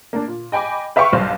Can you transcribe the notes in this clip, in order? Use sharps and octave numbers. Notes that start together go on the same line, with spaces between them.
A#3 D4
A#2
D#5 G5 G#5 B5 D6
B4 E5 F5 G5 C#6
B1 G2 C5 F5